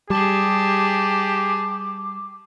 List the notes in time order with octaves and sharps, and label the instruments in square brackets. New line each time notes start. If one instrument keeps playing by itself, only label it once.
[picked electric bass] G3 [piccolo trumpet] G4 [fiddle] G#4 A5 [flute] D6